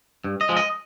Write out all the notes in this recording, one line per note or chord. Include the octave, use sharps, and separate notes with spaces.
G2
D#5
F3 G#3
D#5